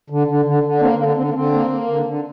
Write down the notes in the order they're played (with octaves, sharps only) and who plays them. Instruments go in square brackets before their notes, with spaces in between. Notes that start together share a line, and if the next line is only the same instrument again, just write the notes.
[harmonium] D3
D3
D3
D3
D4
A#3 C4
D3 A#3
D3 C4
A#3
D3 C4
A#3
A#3
D3
D3